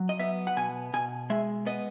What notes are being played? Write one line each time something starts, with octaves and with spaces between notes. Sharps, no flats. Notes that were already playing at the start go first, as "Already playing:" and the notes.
Already playing: F#3
D#5
B3 E5
F#5
B2 G#5
B2 G#5
G#3 E5
B3 D#5